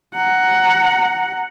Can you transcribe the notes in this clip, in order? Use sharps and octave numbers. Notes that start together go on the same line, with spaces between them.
F#5 A#5